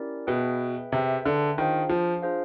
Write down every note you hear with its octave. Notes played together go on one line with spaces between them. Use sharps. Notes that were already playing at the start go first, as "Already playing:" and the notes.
Already playing: C#4 E4 G4 A#4 D5
B2 G#4 B4 E5 G5
C3 G#4 B4 E5 G5
D3
D#3 D4 F4 G#4 C5 F5
F3
D4 F4 G#4 C5 F5